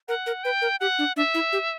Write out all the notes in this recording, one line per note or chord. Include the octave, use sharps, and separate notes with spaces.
A#4 F#5
A#4
B4 G5
A#4
G4 F#5
D4
D4 E5
E4
G4